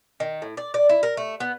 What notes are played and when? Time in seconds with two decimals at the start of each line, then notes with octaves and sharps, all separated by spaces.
0.20 D#3
0.42 A2
0.57 D5
0.74 D5
0.89 E4
1.03 A#4
1.17 A3
1.40 B3